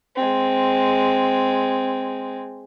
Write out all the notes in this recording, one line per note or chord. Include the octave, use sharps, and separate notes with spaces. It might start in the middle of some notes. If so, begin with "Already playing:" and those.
G#3 C4